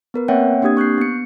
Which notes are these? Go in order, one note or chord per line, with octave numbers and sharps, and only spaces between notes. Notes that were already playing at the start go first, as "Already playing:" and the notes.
B3 A#4 B4
A#3 C4 C#5 E5 F#5 G5
A#3 C4 D4 G4 D#6 G#6
C#6 F#6 G6 C7
B3 C#7